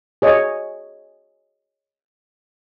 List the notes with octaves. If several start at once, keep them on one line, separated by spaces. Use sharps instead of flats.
G#4 C#5 D#5